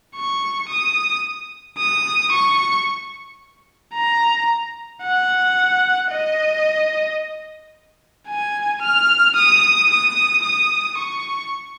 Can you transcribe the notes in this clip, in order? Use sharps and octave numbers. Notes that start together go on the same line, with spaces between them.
C#6
D#6
D#6
C#6
A#5
F#5
D#5
G#5
F6
D#6
D#6
D#6
C#6